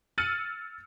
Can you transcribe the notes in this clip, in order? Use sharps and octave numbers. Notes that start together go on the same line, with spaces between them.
E6 F6 A6 C#7 D#7 F#7